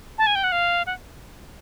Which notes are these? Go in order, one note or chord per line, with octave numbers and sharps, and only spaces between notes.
A5
G#5
G5
F#5
F5
F#5